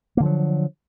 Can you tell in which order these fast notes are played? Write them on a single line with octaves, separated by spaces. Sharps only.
A#3 D3 F3 F#3